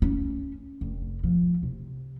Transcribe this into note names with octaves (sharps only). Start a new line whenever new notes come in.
C#4
F1
F3
C3